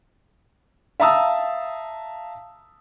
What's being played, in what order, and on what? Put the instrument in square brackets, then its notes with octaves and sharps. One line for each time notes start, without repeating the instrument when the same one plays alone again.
[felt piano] E5 F5 A5 A#5 D#6 E6